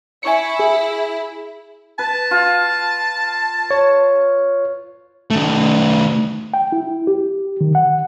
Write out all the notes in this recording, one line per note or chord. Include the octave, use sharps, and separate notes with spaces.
E4 G#5 C#6 C#7
G#4
B4 A5
F4
C#5
D#3 A3
G5
E4
G4
D#3
F#5